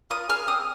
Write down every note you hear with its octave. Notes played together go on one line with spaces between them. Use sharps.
F4 D#6
G#4 F6
C4 D#6